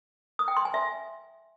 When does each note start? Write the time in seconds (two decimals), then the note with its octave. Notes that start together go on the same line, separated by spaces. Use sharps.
0.39 D#6
0.48 G5
0.57 C6
0.65 G#5
0.74 E5